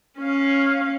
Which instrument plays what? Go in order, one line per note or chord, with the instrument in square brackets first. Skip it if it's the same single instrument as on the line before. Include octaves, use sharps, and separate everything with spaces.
[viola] C#4 F5